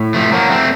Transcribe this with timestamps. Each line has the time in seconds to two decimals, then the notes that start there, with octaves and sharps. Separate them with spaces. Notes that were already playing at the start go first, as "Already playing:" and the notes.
Already playing: A2
0.14 F3 A3
0.33 F#3 A#3
0.50 A3 C4